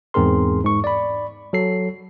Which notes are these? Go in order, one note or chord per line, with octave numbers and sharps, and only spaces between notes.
E2 G#2 C4 G#4 A#4 C6
G#2 C#6
D5 B5
F#3 A4 C7